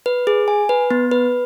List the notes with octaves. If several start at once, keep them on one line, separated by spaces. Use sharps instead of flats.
B4
G#4
G#5
B4
B3
B4